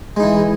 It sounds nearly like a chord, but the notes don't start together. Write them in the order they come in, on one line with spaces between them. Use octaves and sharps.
G#3 D#4 E3